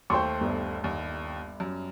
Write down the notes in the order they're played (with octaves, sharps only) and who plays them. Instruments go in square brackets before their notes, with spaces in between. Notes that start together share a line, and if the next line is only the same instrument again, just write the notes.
[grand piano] D#2 A3 C5 [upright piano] G5 C6 C#6
[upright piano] G1 G2
[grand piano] D#2
F#2